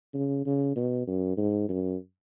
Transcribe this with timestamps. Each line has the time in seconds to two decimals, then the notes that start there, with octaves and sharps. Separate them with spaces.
0.14 C#3
0.46 C#3
0.76 B2
1.07 F#2
1.37 G#2
1.69 F#2